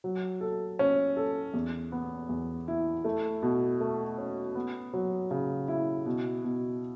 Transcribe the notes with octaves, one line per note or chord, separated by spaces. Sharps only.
F#3
A4
C#4
A4
E2
B3
E2
E4
A3
B2
A3
C#4
B3
F#3
C#3
E4
B2
B2